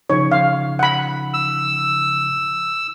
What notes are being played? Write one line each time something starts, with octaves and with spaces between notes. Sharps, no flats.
C#3 F3 D#4 C#5
F5
F#5 B5
E6